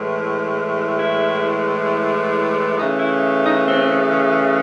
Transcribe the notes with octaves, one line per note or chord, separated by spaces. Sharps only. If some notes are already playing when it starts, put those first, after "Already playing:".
Already playing: A2 E3 G#3
E4
C#3 E3 A3 D#4
E4
D#4
C4